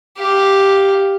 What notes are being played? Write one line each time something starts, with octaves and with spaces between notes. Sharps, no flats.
G4 F5